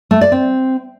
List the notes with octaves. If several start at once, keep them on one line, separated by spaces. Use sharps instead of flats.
A3
D5
C4